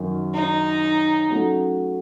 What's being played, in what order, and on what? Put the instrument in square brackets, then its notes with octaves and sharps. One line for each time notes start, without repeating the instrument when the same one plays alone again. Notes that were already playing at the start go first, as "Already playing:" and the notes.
Already playing: [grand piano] F#2 D#3 F#3
[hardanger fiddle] D#4
[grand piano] F#3 A3 C#4 F#4